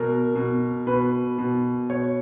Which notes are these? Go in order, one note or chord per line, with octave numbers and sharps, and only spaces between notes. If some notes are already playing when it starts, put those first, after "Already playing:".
Already playing: B2 A#4
B2
B2 B4
B2
B2 C#5